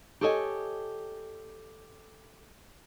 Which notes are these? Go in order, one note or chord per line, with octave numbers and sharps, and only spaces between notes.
G4 A4 C#5 D#5 E5 G#5